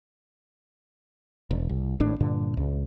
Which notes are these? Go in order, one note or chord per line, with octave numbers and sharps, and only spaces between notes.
E1
C2
G#1 A2 D4
G2 A#2 D3
C#2